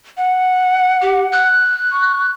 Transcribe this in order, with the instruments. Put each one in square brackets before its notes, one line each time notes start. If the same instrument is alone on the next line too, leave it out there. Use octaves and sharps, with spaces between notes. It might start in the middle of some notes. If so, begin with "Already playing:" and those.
[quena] F#5
[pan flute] G4
F#6
[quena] C#6